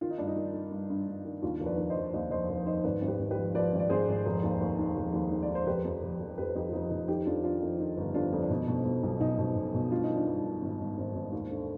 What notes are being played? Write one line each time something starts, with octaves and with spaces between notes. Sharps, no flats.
D#3 F4
D#4
G2 D4
D#4
D#3
D#3
G2
G2
G2
D#3
D#2 D4 F4
F1
B4 D5
D#3
C5 D#5
F1
D#2 C5 D#5
F1 C5 D#5
F1
D#3 C5 D#5
G#1 B4 D5
G#1
G4 B4
G#1
G4 B4
F3
F3 B4 D5
G#1
D5
G#1 G#4 C5
G#1
F1
D#2
D#2
D#3
F1
D#2
D#3
D5
D#3
C5
F1 G4 B4
F2
F1
F1
F2 G4 B4
F2 D#4 G4
F4
F1 D#4
F1 D#4
D#3 D#4 G4
F2 D4 F4
D#3 D4 F4
F2 D#4
D#3 D#4
G1
F2 D4 F4
F2
D4
B2 D#4
B2
B2
B1
B1 D#4
B2
B2
B2
G2 F4
D#4
D#3
D4 F4
G2
D#3
G#1
G#1
G#1
G#1
D#2
D3